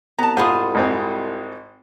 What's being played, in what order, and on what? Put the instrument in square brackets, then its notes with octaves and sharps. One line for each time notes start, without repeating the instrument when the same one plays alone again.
[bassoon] C2 [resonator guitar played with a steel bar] B3 A5 [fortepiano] A#5
[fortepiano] G#2 [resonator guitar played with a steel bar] F4 G#4 C5 [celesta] F#5 B5 D#6
[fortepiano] G#1 G#2 C4